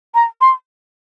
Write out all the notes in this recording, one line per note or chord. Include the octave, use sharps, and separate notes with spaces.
A#5
C6